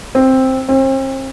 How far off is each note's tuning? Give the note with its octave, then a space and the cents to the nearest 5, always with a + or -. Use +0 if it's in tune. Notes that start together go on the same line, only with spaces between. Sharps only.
C4 +5
C4 +40